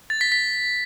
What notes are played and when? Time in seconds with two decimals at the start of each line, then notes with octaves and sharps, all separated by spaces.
0.10 A6
0.21 B6
0.32 B6